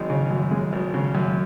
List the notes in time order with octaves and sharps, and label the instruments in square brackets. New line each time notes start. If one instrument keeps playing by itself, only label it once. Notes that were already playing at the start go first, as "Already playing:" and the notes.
Already playing: [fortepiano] G#1 F#2 G#3 D#4
C#3
F#2
G#3
G#1
C#3
F#2